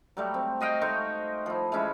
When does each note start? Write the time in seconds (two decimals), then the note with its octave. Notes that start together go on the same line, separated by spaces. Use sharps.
0.17 F#3 G3 A3
0.34 C4
0.61 F#4 D#5 F5 G5
0.81 A3 D#4 C5 C#6
1.46 F3 E4
1.72 E3 G#3 C#4 E4